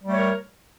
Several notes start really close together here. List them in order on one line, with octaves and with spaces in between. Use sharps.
G3 A3 C#5 A#4